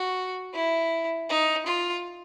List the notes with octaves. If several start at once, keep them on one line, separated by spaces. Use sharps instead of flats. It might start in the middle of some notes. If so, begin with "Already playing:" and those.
Already playing: F#4
E4
D#4
F4